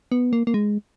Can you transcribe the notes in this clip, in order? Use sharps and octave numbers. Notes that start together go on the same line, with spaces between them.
B3
A#3
A#3
G#3